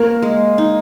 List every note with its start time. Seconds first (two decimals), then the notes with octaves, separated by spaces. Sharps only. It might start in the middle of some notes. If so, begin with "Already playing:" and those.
Already playing: A#3 A#4
0.22 G#3
0.58 D#4